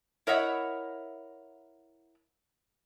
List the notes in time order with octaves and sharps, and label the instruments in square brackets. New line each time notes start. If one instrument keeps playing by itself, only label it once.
[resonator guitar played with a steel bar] E4 A#4 C#5 D#5 E5 F#5